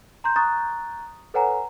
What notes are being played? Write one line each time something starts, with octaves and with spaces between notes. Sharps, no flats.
A#5 C6 G6
A#5 C#6 D#6 F#6 A6
A4 B4 C#5 F#5 G#5 A#5